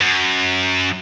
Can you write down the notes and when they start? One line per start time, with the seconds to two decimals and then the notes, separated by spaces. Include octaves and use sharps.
0.01 F#2